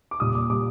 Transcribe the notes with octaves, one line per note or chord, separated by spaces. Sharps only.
D6
A#2 G3 D#6
D6
A#2 G3 D6